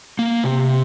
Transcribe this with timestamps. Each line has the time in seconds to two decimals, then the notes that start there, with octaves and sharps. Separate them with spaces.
0.19 A#3
0.44 C3